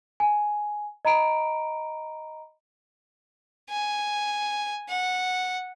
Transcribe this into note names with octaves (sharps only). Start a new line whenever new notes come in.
G#5
D#5 A#5 B5 D7
G#5
F#5